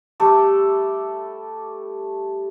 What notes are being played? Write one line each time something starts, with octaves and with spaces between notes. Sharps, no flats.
G3 A3 A4 D6